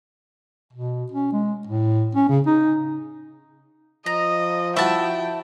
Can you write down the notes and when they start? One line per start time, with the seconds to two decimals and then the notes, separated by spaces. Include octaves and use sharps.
0.73 B2
1.12 C#4
1.32 G#3
1.67 A2
2.15 C#4
2.29 C#3
2.46 D#4
4.06 F3 D#5 A#5
4.77 E4 F#4 E5 G5 A5